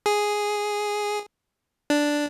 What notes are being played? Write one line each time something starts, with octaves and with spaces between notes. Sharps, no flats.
G#4
D4